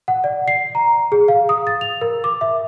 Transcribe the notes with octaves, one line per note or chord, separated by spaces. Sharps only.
F#5
D5
C7
A#5
G#4
F5
D#6
A6
F7
A#4
D6
E5